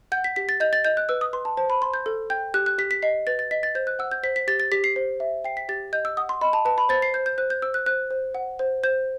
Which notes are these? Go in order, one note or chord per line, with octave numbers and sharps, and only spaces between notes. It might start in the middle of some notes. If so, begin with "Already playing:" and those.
F#5 G6
B6
G4 B6
A6
D#5 G6
A6
D#5 G6
F#6
B4 E6
D#6
B4 C6
A5
C5 A5
B5
C5 C6
G6
A4
G5 G6
G4 F#6
F#6
G4 B6
B6
D#5 C7
B4 A6
A6
D#5 B6
A6
C5 G6
F#6
F#5 E6
G6
C5 B6
B6
G4 A6
A6
G4 B6
C7
C5
E5
G5 C7
B6
G4 A6
D#5 G6
E6
F#5 D#6
C6
D#5 B5
A5
B4 A5
B5
C5 A6
C7
C5 G6
G6
C5 F#6
G6
C5 E6
F#6
C5 F#6
C5
F#5
C5
C5 G6